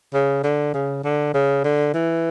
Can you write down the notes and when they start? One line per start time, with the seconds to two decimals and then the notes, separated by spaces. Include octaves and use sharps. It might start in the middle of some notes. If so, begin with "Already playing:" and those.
0.14 C#3
0.43 D3
0.74 C#3
1.04 D3
1.34 C#3
1.64 D3
1.94 E3